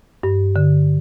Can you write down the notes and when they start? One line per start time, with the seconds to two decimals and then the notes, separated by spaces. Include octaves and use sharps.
0.23 G2
0.56 D3